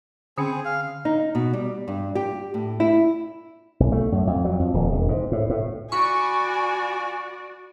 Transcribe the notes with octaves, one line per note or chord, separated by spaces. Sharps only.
D3 C4 C#4 G#4
F5
D#4
B2
G3
G2
G4
A2
E4
B1
A3
F#2
F2
F#3
F2
D#1
E1
G#2
A2
A2
F#4 D5 G#5 B5 C#6